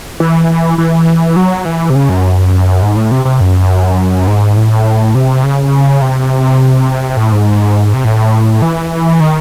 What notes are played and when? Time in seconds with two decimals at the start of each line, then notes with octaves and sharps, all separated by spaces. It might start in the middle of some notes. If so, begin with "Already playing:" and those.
0.20 E3
0.78 E3
1.36 F#3
1.65 E3
1.90 C3
1.95 C#3
2.09 F#2
2.82 G#2
2.96 A2
3.11 C3
3.25 C3
3.41 F#2
4.27 G#2
4.57 A2
5.15 C3
5.44 C#3
6.02 C3
7.17 A2
7.32 G#2
7.94 C3
8.05 A2
8.62 E3
9.20 D#3